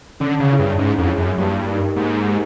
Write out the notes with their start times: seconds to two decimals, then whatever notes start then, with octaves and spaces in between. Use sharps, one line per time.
0.20 D3 C#4
0.40 C#3
0.50 E4 G#4 C#5
0.59 G2
0.78 G#2 C#4
0.98 F2
1.08 E4 G#4 C#5
1.18 F#2
1.37 G2 A#3
1.67 D#4 G4 A#4
1.96 G#2 A#3
2.25 D#4 G4 A#4